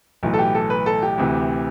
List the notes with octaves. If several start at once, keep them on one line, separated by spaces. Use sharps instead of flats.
B1 A2 E3
A4
G4
A4
B4
A4
G4
D2 C3 E3